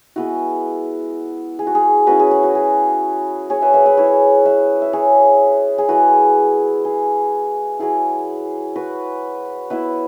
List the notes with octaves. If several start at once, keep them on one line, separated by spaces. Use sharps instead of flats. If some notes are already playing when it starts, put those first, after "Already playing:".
G#3 B3 E4 F#4
G#4
F#4
G#4
F#3 C#4 E4 F#4 B4
G#4
G#4
F#4
G#4
G#4 C#5
B4 E5
B4 E5
B4 E5
G#3 E4 G#4 C#5
B4 E5
E5
G#4 C#5
G#4
G#3 E4 F#4 B4
G#4
F#3 E4 G#4
F#4 B4
F#3 B3 E4 B4 E5